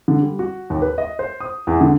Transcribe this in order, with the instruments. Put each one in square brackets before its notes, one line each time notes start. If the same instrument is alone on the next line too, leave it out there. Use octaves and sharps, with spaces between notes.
[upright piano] D3
G3
F#4
D#2
B4
D#5
C5
D#6
E2
D3